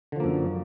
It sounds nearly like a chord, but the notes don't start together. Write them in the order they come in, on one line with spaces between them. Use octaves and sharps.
D3 F3 A#3 F#2